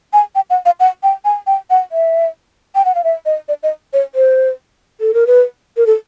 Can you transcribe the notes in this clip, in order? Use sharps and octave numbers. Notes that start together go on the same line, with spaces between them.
G#5
G5
F#5
F5
F#5
G5
G#5
G5
F#5
E5
G5
F#5
F5
E5
D#5
D5
D#5
C#5
C5
A4
A#4
B4
A#4
A4